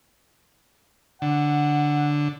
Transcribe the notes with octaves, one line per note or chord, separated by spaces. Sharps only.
D3 F#5